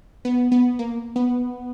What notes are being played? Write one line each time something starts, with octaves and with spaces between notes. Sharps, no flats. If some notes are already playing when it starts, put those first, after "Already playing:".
B3
B3
A#3
B3